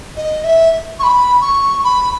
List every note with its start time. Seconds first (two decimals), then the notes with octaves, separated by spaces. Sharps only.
0.16 D#5
0.44 E5
0.99 C#6
1.03 B5
1.41 C#6
1.84 B5